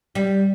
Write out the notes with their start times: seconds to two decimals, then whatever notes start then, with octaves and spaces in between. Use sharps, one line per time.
0.15 G3